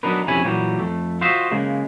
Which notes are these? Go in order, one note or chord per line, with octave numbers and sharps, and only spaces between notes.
F#3 B3 D4 D#4 A#4 B4
F2 C3 C#4 E4 G#5 B5
A#2 E3 F#3 G3 G4
F2 A3
F4 F#4 C5 D#5 E5
C#3 G#3 A#3